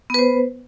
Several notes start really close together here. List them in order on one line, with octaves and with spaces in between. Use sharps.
B3 B4 C5